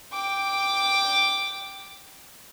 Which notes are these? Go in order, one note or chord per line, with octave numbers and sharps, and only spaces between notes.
G5 D6